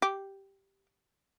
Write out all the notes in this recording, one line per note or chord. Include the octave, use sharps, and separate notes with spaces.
G4